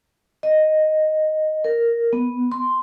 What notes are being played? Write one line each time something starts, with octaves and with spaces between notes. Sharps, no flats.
D#5
A#4
B3
C6